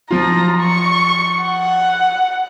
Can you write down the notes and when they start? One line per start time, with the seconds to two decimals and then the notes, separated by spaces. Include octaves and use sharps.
0.11 F3 F4 A#5
0.61 C#6
1.44 F#5